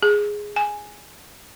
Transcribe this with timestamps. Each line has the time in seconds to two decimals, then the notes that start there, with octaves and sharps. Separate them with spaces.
0.03 G#4
0.56 G#5